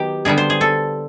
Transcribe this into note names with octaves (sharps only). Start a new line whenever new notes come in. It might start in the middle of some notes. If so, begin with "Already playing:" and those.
Already playing: D#3 F#3 B3 G4
D3 G3 B3 G#4
C5
G#4
A4